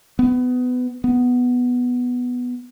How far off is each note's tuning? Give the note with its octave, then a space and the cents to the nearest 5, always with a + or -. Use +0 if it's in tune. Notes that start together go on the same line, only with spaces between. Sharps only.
B3 +20
B3 +0